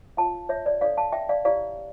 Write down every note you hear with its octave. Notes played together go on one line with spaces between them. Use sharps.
F4 A#4 C#5 F5 A5
C#5 E5
D5
D4 A4 C#5 D5 F5
F5 A5
E5 G5
D5 F5
E4 G4 C#5 D5 F5